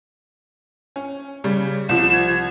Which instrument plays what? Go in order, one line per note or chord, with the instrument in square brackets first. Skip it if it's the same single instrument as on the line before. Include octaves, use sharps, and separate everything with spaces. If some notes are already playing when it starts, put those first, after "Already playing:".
[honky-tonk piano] C#4
C#3 G3
[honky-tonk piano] C2 F3 [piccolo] E7
[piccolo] G#6